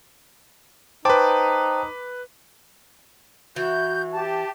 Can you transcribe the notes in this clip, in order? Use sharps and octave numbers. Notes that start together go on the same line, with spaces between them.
D#4 B4 C5 G5 A5 D6
E3 F#4 G6
G4 A5